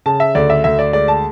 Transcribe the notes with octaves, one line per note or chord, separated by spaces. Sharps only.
C#3 A5
E5
D2 D5
E5
D2 E5
D5
G#3 D5
A5